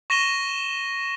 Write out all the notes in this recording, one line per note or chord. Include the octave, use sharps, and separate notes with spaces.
C#6 A#6 D#7 E7 G7